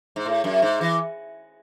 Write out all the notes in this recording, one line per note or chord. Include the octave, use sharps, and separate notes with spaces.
G#2
A2
F#2
G#2
E3